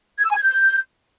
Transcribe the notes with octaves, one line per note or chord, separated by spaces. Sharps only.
G#6
E6
G#5
G#6
G6